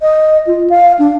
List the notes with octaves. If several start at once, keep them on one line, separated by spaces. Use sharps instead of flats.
D#5
F4
F5
D4